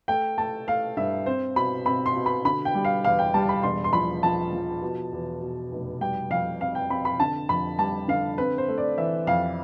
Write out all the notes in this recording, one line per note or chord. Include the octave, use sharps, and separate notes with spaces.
A3 G5
A3 A5
A3 F5
G2 E5
C4 C5
B2 B5
C4 B5
C6
B2
B5
D3 B5
G5
G3
F5
E2 F5
G5
G3 A5
B5
E1 C6
C6
F3 B5
F3 A5
F3
B2
E2
B2
F1
G3 G5
F2 F5
C4 F5
G5
C4 B5
B5
D3 A5
F2 B5
G3 A5
D3 F5
C4 B4
C5
A3
D5
E3 E5
F2 F5